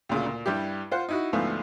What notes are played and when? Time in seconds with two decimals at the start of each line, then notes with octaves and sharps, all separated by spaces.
0.09 D2 A#2 C#3
0.26 A#2
0.46 G2 G3 E4 G4
0.91 F4 C5 F#5
1.09 D#4 E4 F#4
1.33 D2 G#2 F3 A3 B3 F4